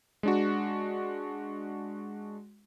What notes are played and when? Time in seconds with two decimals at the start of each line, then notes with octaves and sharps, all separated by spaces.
0.23 G#3 D4 F#4